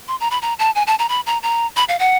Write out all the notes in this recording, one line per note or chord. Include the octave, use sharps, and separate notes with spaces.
C6
A#5
B5
A#5
A5
G#5
A5
A#5
B5
A#5
A#5
B5
F5
F#5